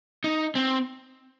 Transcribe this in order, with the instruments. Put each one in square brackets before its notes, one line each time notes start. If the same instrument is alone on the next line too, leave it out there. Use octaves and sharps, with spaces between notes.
[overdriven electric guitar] D#4
C4